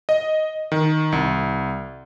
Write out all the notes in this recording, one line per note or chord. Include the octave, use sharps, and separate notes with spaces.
D#5
D#3
C2